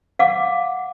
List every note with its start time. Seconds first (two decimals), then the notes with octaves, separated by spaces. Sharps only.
0.19 F5 F#5 D6